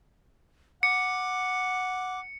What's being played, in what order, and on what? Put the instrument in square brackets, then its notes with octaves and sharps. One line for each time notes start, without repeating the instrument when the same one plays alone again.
[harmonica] F#5 [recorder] D6 [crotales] C#7